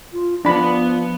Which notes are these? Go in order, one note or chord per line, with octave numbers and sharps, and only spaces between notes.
F4
F3 B3 D4 B5